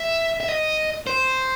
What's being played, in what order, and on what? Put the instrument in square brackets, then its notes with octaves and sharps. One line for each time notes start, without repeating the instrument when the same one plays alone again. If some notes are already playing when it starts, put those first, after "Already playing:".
Already playing: [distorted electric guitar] E5
E5
D#5
C5